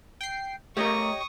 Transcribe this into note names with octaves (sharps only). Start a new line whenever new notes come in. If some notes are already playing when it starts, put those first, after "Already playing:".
G5 C7
A3 G4 A#4 C#5 D#5 C#6 D#6